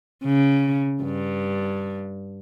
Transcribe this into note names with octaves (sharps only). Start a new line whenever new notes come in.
C#3
G2